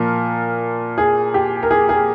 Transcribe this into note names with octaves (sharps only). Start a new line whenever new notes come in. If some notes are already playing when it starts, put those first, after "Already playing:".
Already playing: A#2 F3 A#4
G#4
G4
A#4
G#4
G#4